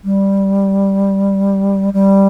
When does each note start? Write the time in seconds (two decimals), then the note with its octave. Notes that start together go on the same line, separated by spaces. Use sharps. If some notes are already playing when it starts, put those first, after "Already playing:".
0.04 G3
1.94 G3